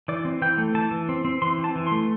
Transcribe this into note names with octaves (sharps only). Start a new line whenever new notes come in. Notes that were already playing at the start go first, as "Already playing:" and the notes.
E3 D5
C4
E3 G5
A3
E3 A5
E3
C4
C4
E3 C6
C4
A5
E3
C6
A3